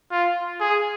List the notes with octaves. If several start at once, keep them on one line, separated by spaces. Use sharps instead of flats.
F4
G#4